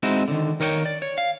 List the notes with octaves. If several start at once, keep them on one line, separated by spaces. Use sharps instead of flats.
G#3 C4 D#4 E4 F#4
D3 D#3
D#3 A#4 C#5 D5 G5
D5
C#5
F5